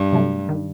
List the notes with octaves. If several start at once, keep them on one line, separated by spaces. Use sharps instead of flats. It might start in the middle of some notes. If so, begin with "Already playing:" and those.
Already playing: G2
C3 F#3 A3
D#3